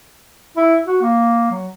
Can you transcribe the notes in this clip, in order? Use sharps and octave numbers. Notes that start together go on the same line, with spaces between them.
E4
F#4
A#3
F#3